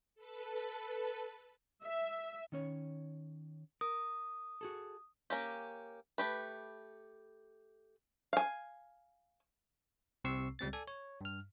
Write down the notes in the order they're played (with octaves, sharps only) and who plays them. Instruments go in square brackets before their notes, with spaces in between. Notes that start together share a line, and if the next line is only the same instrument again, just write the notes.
[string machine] A4 B4 A5
[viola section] E5
[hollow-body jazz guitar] D#3 C#4 C#5
[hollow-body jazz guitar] A#4 [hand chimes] D#6
[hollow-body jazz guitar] F#4 G#4 A4
[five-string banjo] A#3 C#4 G4
A3 G4 B4
F5 G#5
[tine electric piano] C2 C3 C4 C#6 E6 C7
C#2 G3 C4 A6
A4 D5 G#5
C#5
G2 F6